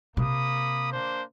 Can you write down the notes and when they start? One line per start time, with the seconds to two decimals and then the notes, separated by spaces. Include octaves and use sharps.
0.17 C3 A#3 B5 D#6
0.92 A#3 D4 C5